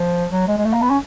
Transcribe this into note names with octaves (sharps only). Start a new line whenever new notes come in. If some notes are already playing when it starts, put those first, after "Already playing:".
Already playing: F3
F#3
G#3
G#3
A3
A#3
B3
C#4